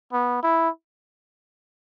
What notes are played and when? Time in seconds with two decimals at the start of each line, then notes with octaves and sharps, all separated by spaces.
0.13 B3
0.43 E4